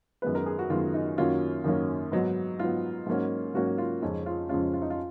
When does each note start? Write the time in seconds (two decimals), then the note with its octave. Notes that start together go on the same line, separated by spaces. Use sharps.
0.22 F#2 D#3 G#3 B3 B4
0.35 A#4
0.46 G#4
0.59 F#4
0.70 F#2 D#3 G#3 B3 F4
0.94 D#4
1.18 F#2 D#3 F#3 A#3 C#4 F4
1.64 F#2 D#3 F#3 A#3 C#4
2.12 G#2 F#3 B3 D#4
2.59 G#2 F#3 B3 F4
3.06 G#2 F#3 A#3 C#4
3.54 G#2 F#3 A#3 C#4 F#4
3.78 F4
4.02 F2 C#3 G#3 C#4 D#4
4.26 F4
4.49 F2 C#3 G#3 C#4 F4
4.74 F4
4.82 D#4
4.90 F4